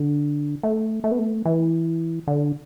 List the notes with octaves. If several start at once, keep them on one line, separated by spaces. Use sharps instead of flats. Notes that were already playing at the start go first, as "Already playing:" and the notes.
Already playing: D3
A3
A3
B3
A3
E3
D3